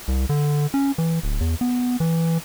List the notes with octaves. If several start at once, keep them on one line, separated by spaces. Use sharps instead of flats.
C2
D3
C#4
E3
D1
E2
B3
E3